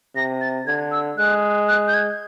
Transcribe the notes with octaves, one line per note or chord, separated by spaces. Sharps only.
C3 A#6
A6
D3 G#6
E6
G#3 F#6
F#6
G6
G#6